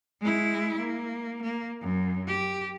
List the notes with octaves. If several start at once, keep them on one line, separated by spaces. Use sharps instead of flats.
G#3 E4
A#3
A#3
F#2
G4